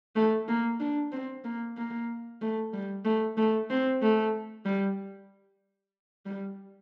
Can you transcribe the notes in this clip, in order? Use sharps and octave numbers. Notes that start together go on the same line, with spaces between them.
A3
A#3
D4
C4
A#3
A#3
A3
G3
A3
A3
C4
A3
G3
G3